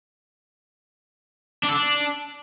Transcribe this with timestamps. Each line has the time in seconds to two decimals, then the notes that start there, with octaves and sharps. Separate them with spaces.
1.63 D4
1.69 A4
1.74 D4